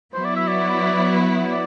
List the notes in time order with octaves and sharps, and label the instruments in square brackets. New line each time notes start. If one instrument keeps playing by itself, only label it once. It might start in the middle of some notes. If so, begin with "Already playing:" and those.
[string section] F#3 B3 E4 [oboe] C5
[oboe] D5
E5
D5
D5